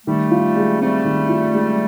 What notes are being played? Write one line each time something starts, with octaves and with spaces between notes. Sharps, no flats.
D#3 G3 A3
F4
G#3
G3 A3 C4
D#3
F4
G#3